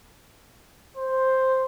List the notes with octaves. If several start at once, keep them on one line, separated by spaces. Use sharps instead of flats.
C5